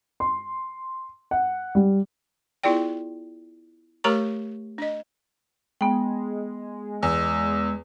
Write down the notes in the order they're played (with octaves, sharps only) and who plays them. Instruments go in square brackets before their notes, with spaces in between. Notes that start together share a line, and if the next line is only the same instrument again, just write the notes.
[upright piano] C6
F#5
G3
[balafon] B3 E4 F4 G#4 D5 G5
A3 G4 A#4 C#5 A#5 C#6
D4 D#5
[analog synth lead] G#3 [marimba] B3 G5
[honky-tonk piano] E2 [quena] E6